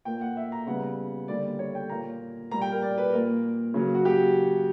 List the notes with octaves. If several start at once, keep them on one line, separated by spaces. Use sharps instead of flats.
A#2 A#3 G5
F#5
E5
A#5
C#3 G3 B3 F#5
D3 G3 A#3 D5
D5
C#5
G5
A#2 A#3 A#5
A#2 G3 A#3 A#5
G5
A#4
D5
B4
A#2 A#3 A#4
C#3 F#3 A#3
F#4
G4